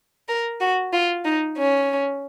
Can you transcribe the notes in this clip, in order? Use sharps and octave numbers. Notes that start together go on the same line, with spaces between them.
A#4
F#4
F4
D#4
C#4